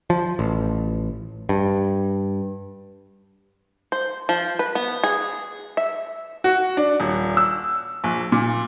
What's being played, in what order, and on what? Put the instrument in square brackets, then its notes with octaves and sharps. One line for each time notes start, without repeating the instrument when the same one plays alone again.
[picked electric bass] F3
A1
G2
[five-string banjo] C5
F3
B4
B3
G#4
E5
[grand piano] F#4
D4
D#1
E6
A#1
A#2